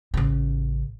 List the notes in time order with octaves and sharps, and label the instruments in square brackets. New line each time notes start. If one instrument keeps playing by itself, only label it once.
[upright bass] A1 C#3